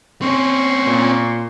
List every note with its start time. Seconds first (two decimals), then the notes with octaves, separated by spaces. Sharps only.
0.22 C4 C#4 C6 C#6
0.87 A#2